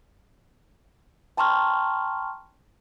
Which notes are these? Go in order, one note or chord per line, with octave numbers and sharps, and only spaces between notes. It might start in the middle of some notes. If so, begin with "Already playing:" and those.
G5 A5 A#5 C6 C#6 F6